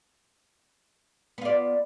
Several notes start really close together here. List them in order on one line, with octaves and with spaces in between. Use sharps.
B3 F4 D5